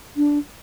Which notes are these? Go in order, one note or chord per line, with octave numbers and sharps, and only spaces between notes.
D4